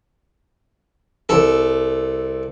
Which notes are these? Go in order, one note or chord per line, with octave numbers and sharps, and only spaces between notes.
C2 A4